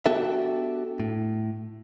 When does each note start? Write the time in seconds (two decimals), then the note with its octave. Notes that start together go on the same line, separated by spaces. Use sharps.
0.06 B3 D4 F#4 G4 A4 E5
1.00 A2